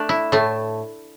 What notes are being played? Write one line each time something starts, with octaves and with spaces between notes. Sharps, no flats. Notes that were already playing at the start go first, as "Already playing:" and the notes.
Already playing: A3 D4
E4
A2 A3